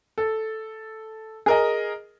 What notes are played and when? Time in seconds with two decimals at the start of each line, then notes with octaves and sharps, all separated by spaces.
0.18 A4
1.46 G#4 A#4 D#5